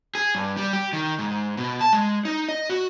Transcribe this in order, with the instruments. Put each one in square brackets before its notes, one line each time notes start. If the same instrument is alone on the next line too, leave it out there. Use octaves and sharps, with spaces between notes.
[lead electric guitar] G#4
G2
G3
G4
D#3
G#2
B2
A5
G#3
D#4
D#5
F#4